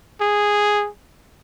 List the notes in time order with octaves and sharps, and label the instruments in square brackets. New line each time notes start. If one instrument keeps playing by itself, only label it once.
[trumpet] G#4